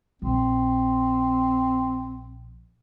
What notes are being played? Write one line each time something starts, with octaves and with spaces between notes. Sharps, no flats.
A#1 C4